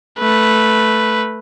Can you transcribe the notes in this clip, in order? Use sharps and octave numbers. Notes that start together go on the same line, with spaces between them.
A3 B4